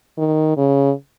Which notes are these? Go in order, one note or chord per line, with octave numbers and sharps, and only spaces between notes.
D#3
C#3